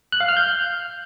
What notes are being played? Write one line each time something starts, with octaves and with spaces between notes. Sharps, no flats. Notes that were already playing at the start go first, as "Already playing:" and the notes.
F#6
F5
F6
G6